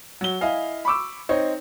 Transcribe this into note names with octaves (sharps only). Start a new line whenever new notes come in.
F#3 G7
E4 D#5 F5 G#5
B5 C#6 D6 E6
C4 D#4 C#5